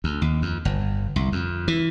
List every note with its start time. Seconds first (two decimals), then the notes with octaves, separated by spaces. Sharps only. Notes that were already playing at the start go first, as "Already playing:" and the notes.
0.04 D2
0.22 D#2
0.42 F2
0.65 G1
1.16 C2
1.32 F2
1.68 E3